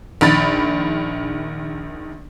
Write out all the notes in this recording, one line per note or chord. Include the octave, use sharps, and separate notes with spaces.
A#1 D#3 B5 A6